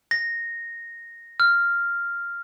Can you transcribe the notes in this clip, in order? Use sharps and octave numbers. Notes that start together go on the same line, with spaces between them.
A#6
F6